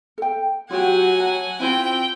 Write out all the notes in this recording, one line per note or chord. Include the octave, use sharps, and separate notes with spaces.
A4 G5
F#3 F4 G4 F#5 G#5
A5
C4 E4 F4 G5